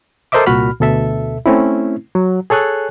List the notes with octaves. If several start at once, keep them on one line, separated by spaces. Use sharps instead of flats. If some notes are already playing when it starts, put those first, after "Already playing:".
A4 A#4 C5 D#5 E5 D6
C2 A#2 F#4 B5 F6
D2 B2 A4 E5
A3 C4 C#4 E4
F#3
G#4 A4 C#5 G#5 F#6